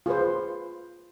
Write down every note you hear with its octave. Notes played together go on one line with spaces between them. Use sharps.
F4 G#4 B4 C5